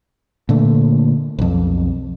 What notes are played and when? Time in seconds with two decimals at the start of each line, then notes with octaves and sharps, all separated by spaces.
0.49 A#2 D3 A3
1.39 B1 F2